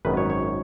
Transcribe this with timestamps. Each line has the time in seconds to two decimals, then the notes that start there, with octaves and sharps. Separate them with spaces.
0.05 G#1 F#2 D#3 B4
0.17 C#5
0.30 C#5